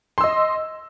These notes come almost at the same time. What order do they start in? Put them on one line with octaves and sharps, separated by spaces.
C6 E6 D#5